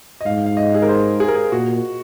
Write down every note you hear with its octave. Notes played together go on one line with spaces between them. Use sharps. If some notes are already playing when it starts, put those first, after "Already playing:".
D#5
G#2 F5
F5
D#5
G#4
A#4
C5
G#4
A#4
G#4
A#2 F#4